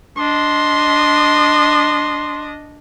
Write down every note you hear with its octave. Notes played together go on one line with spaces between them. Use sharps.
D4 D#5 C6